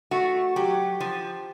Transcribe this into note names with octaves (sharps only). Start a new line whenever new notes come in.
A3 F#4
F#3 G4
F3